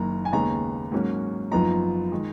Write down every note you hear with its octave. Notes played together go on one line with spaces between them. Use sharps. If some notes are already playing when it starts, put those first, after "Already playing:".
Already playing: F#1 F#2 D#3 A#3 A#5
G#5
D#2 C#3 G#3 B3 D#4 A#5
G#2 F#3 A#3 C#4
F#1 F#2 F3 B3 D#4 A#5
D#3 G#3